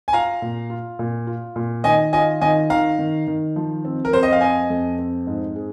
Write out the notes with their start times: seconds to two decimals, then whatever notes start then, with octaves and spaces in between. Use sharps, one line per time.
0.08 G#5
0.13 F4 F5 A#5
0.42 A#2
0.70 F4
0.99 A#2
1.27 F4
1.56 A#2
1.84 D#3 D#5 G#5
2.13 F4 D#5 G#5
2.41 D#3 D#5 G#5
2.70 D#3 F5 A#5
2.99 D#3
3.27 D#3
3.56 F3
3.85 C4
4.05 A#4
4.13 F2 C5
4.23 D#5
4.33 F5
4.41 C4 D#5 G#5
4.70 F2
4.99 C4
5.27 G#2
5.55 G#4